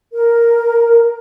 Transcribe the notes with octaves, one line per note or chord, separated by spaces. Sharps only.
A#4